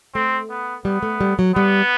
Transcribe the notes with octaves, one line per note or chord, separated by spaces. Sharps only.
A3 C4
B3
G3 B3
A3
G3
F#3
G3 B3